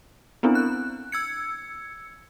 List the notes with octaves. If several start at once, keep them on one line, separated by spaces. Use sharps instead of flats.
B3 C4 D4 E4
F#6
E6 G#6 C#7